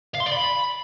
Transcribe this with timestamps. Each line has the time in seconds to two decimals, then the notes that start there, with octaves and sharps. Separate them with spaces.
0.15 F5
0.20 C6
0.26 D5
0.32 B5